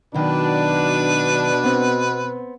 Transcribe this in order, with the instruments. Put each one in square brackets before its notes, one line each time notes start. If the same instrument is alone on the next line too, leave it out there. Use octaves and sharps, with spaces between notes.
[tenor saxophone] B2 [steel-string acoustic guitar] D#3 F#3 [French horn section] D4 [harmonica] B4
[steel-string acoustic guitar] B3 C4